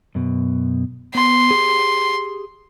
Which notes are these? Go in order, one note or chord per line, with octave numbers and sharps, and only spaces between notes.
F#2 B2
B3 C6
G4 G#4